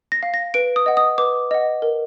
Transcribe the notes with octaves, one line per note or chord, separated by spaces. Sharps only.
A#6
F5
A#6
B4 D7
D#6
D#5 F#5
D#6
B4 D6
D#5 F#5
A#4